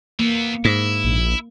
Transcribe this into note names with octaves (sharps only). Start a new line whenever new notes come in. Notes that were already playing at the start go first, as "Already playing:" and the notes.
E3 A#3 B3
G#2 E4
A#1